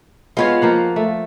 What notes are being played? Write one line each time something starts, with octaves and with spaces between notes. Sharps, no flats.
G#3 B3 F4 C#5 F5
F3 A#3 F#5
A3